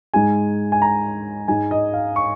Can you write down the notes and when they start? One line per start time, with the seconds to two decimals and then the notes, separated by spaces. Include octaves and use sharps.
0.14 G#2 G#3 D#4 G#5
0.72 G#5
0.82 A#5
1.48 G#2 G#3 D#4 G#5
1.71 D#5
1.93 F5
2.16 C#6